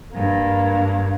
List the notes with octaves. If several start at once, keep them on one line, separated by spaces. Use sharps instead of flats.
G2 A#3